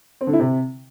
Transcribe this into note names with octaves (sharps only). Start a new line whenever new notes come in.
C4
D3
E4
C3